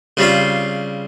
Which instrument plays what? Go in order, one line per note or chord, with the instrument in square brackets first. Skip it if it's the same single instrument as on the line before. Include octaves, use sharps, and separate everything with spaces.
[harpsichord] C#3 G3 C4 F4